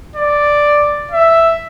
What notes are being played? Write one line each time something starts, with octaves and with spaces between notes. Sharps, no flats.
D5
E5